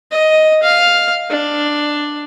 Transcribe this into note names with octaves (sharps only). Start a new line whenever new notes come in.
D#5
F5
D4